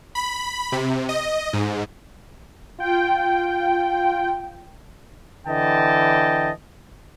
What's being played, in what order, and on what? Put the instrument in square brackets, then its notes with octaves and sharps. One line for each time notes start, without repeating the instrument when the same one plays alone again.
[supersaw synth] B5
C3
D#5
G#2
[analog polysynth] F4 G5
[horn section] D3 E3 D#5 G5 A5